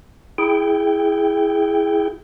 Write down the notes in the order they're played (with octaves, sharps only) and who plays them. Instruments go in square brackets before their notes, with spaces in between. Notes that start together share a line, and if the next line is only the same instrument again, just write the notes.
[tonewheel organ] E4 G#4 G5